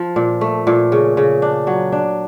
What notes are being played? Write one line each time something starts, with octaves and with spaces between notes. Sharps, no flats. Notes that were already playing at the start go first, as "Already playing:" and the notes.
Already playing: F3
A#2
A3
A#2
C#3
C#3
D4
F#3
D4